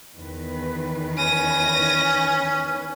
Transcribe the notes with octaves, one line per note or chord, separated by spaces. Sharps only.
E2 D#3 B4
C#4 A#6 D#7